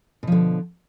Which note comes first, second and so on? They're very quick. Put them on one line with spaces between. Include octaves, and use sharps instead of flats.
B2 F3 D3